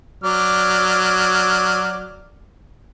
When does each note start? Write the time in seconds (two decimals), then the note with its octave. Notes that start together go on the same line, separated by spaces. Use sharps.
0.24 F#3 D5 F6